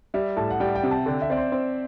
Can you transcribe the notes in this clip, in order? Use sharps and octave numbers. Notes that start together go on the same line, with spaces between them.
G3 E5
A2 A5
F#5
G3 G5
G5
C3
A5
D3 G5
E5
C4 D5
C5
C4